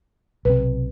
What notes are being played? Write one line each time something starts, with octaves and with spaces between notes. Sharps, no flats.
B1 C3 B4